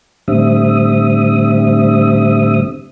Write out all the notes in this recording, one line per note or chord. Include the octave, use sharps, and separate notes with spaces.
A2 D3 G3 C4 E5 D#6